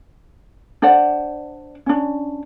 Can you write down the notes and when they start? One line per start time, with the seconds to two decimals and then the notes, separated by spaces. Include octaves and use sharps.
0.82 D4 C5 D5 F#5
1.86 C#4 D4